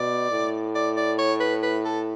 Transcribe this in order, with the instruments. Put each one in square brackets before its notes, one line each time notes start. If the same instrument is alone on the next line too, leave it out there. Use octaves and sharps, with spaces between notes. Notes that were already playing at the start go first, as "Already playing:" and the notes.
Already playing: [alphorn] B2 [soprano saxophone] D5
[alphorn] A2
[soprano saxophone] D5
D5
C#5
B4
B4
A4